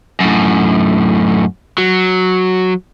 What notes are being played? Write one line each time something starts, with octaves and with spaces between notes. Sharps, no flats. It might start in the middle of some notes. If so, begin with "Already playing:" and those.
F#2 A2
F#3